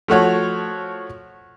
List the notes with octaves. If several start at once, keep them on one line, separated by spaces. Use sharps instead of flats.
F3 A3 F#4 C#5